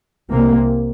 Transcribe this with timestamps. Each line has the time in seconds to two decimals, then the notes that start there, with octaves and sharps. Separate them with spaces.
0.31 C2 C3 A#3